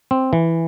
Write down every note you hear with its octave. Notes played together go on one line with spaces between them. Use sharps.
C4
E3